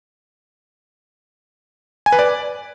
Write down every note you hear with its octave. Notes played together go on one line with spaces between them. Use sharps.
G#5
B4
D5